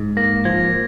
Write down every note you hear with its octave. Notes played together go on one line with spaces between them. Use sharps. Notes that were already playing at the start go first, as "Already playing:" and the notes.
Already playing: G#2
A#3 A#6
F3 G#6